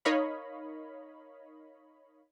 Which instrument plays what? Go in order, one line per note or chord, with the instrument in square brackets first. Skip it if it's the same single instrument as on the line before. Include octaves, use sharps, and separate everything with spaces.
[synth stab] D#4 A#4 C#5 D#5 F5 B5